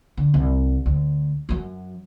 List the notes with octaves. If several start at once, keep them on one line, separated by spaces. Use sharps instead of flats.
D3
C2
D2
F#2 F#3